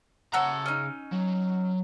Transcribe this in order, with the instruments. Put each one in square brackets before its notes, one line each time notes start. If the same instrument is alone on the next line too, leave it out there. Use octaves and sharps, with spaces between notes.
[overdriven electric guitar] C#3 A#5 [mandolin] F#4 A4 C#5
[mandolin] C#4 D#4
[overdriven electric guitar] F#3